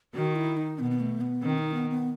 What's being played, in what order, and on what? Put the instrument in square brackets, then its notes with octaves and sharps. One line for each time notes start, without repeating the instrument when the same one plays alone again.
[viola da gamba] D#3 [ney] F#4
[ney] E4
D#4
[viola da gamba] B2 [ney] B3
[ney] B3
A3
B3
[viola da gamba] D#3 [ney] C4
[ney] D#4
B3
B3